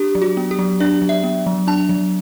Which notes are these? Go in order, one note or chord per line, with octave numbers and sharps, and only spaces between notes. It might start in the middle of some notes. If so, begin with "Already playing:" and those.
Already playing: D4 G4
F#3
F#4
B3
G4
F#3
D4 D5
F#3
E5
B3
F#3
D4 A5
F#3